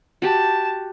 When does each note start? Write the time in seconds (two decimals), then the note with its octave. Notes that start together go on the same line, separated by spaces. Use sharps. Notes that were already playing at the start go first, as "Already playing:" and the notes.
0.22 F#4 G4 A5